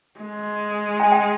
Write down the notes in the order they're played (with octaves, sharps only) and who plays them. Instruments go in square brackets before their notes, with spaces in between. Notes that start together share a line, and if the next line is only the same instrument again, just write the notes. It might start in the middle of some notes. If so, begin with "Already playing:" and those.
[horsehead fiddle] G#3
[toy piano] G#5
G5